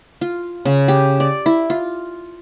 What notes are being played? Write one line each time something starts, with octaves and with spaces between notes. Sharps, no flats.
F4
C#3
G4
D5
E4
F4